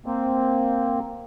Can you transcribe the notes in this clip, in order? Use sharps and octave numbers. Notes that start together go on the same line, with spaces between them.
A#3 C4